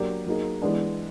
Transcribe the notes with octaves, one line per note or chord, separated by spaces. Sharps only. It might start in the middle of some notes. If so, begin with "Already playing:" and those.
Already playing: F#3 A#3 D4 G4
F#3 A#3 D#4 G#4
E3 G#3 B3 D4